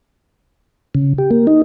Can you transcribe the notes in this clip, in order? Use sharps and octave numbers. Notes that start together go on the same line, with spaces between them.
C#3
G4
A#3
D#4